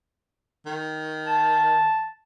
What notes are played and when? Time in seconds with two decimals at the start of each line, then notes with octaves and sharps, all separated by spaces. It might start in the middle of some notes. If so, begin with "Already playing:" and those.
0.66 D#3
1.26 A5